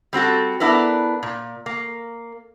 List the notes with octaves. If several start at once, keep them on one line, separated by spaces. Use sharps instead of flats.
G3 C4 F#4 A4
B3 D4 E4 A#4 B4
A#2
A#3